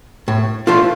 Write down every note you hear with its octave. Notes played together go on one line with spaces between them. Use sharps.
A2
F3 A3 D4 F4